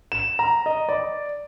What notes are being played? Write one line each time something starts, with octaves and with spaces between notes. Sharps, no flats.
E7
A#5
D#5
D5